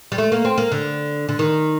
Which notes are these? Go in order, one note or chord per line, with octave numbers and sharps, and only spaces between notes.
G3
A3
A#3
C4
A#3
D3
D3
D#3